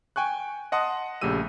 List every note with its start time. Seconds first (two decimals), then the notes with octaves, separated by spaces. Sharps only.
0.16 G5 G#5 C#6 F#6
0.72 D#5 F#5 A5 C6 D#6
1.21 A#1 C#3 A3 G4 E6 D#7